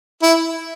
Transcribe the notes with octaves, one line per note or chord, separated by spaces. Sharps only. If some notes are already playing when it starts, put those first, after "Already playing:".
E4